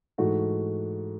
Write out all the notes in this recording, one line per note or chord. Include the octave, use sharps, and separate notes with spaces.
G#2 E3 A3 F#4